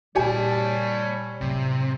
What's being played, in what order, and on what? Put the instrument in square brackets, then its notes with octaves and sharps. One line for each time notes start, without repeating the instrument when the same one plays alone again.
[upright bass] A#2 B3 [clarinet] G3 [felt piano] G4 G#5 [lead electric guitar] C#5 A5
[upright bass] A2 F#3 [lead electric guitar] C3